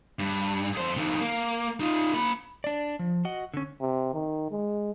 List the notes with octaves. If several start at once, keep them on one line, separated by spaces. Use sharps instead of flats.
G2
F2 C5
F2 D#3
A#3
D#4 F4
A#3 B5
D4 D5
F3
F#4 D#5 F#5
D3 C#4
C3
D#3
G#3